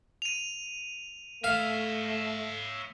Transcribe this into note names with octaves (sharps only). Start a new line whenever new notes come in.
D#7 F7
A3 C#5 E5 F5